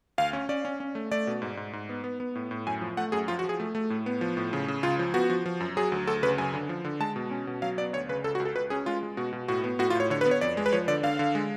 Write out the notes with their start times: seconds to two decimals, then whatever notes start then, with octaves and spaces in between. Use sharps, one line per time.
0.18 D2 F5
0.33 C#4
0.49 C#4 D5
0.65 C#4
0.80 C#4
0.95 A3
1.11 A3 D5
1.27 B2
1.42 G#2
1.57 G#2
1.73 G#2
1.89 B3
2.04 B3
2.20 B3
2.35 A2
2.51 A2
2.67 F#2 G#5
2.81 F3
2.97 A3 F#5
3.12 F#2 G#4
3.28 F3 F4
3.39 F#4
3.44 F3
3.49 G#4
3.60 A3
3.75 A3
3.90 A2
4.06 B3
4.21 F3
4.37 A2
4.53 C#3
4.68 C#3
4.83 C#2 F4
4.99 F3
5.14 B3 F#4
5.30 F3
5.46 F3
5.60 F#2
5.77 F#3 G#4
5.92 D2
6.07 D2 A4
6.23 C#3 B4
6.38 F#2 G#5
6.54 D3
6.69 F3
6.84 D3
7.00 G#3 A5
7.16 B2
7.31 C#4
7.47 B2
7.62 F#3 F5
7.78 B3 D5
7.93 D2 C#5
8.09 C#3 B4
8.24 C#2 A4
8.35 F#4
8.40 C#2
8.45 A4
8.55 C#2 B4
8.70 C#4 G#4
8.86 G#3 F4
9.03 G#3
9.17 B2 F#4
9.33 B2
9.48 A2 F#4
9.64 B3
9.79 A2 F#4
9.90 F4
9.95 A2 C#5
10.10 D3 C#5
10.21 B4
10.26 B3
10.31 C#5
10.41 F2 D5
10.57 G#3
10.66 B4
10.73 F3 C#5
10.88 D3 D5
11.03 D3 F5
11.19 D3
11.35 G#3